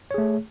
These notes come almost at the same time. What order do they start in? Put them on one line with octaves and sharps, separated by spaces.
C#5 G#4 A3